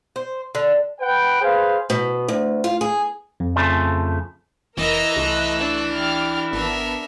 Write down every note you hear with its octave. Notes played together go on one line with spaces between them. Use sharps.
C5
D3
B4 F#5 G5
G#4 B4 C5 F5
B2
D2
F4
G#4
F2
C#3 F3 A3
F1 E3 A#4 D#5 A#5 E6 A#6
C2 A3 E6 F#6
D4
G4 D6 F6
G#1 B3 D4 A#4 E5